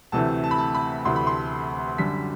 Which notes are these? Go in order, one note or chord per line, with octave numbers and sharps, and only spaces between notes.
D2 C3 E3 A3 A5
A5
B5
A5
B5
D2 C3 E3 A3 C6
B5
C6
F#2 D3 G3 B6